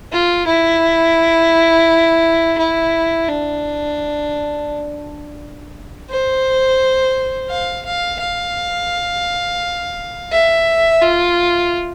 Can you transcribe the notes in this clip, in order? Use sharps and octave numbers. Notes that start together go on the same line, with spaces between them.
F4
E4
E4
D4
C5
F5
F5
F5
E5
F4